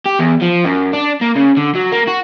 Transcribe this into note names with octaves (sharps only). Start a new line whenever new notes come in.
G4
E2
F3
F#2
D4
A#3
C#3
D3
F#3
A#3
F#4